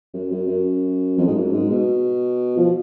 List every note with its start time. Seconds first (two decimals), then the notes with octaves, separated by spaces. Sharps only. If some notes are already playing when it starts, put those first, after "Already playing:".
0.14 F#2
0.31 F#2
0.48 F#2
1.18 F2
1.27 G#2
1.35 F#2
1.52 G#2
1.70 B2
2.57 F3